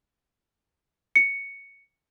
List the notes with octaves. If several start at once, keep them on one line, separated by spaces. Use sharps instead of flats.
C#7